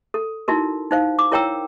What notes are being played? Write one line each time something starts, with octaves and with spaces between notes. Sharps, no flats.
A4
D#4 E4 F#4 A#4
D#4 C5 F5
D6
E4 A#4 C#5 G5 A#5 E6